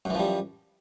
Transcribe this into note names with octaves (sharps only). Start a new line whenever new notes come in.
F#2 E3 F3 G3